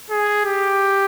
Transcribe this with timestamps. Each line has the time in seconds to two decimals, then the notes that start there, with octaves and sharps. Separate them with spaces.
0.10 G#4
0.45 G4